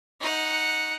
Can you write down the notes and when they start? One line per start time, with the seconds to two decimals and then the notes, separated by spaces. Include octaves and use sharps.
0.20 D#4 F#5